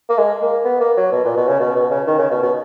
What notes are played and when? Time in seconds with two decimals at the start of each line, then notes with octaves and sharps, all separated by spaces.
0.10 A#3
0.18 G#3
0.42 A#3
0.65 B3
0.80 A#3
0.97 F#3
1.12 B2
1.25 A#2
1.36 B2
1.48 C#3
1.60 B2
1.76 B2
1.91 C#3
2.07 D#3
2.19 C#3
2.31 B2
2.43 B2